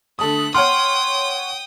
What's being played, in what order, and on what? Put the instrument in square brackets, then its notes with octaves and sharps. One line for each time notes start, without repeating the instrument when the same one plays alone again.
[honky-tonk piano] D3 A4 D#6 [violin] A3 F#6
[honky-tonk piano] C#5 F#5 F6 [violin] G5 D#6 [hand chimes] C6